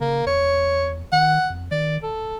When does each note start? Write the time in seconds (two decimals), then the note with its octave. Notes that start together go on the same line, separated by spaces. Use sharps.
0.01 C#3 A#3
0.26 E2 C#5
1.12 D#3 F#5
1.50 F2
1.71 D#3 D5
2.03 D#1 A4